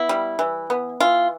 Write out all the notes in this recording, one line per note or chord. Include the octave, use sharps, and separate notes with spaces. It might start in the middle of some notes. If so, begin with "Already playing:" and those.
Already playing: B3 E4
G3
E3
B3
E3 F4